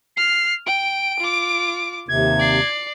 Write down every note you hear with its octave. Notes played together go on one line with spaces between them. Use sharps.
F6 C7
G5 D7
F4 D6
D#2 C3 G#6
D5 C7